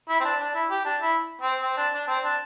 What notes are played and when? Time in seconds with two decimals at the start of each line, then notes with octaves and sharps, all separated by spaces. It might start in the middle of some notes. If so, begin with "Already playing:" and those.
0.09 E4
0.20 C4
0.25 D4
0.40 D4
0.55 E4
0.71 G4
0.85 D4
1.01 E4
1.42 C4
1.62 C4
1.77 D4
1.94 D4
2.08 C4
2.24 D4